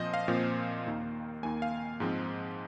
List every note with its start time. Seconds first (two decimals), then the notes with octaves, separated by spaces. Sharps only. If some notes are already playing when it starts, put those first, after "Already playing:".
Already playing: A#2 F3 C4 C5 D#5
0.14 F5
0.28 A#2 F3 C4
0.86 D#2 D#3 A#3
1.43 D#2 D#3 A#3 G#5
1.62 F5
2.00 G#2 F3 G#3 C4